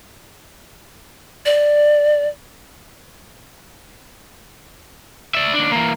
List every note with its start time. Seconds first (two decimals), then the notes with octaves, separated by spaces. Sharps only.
1.45 D5
5.35 D5 E5
5.54 D#2 D4
5.72 E3 A#3